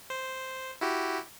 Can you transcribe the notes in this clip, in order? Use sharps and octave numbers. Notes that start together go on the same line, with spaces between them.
C5
E4 F#4 G4